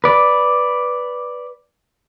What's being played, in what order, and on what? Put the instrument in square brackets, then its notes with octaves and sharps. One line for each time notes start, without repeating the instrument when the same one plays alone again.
[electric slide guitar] B4 D5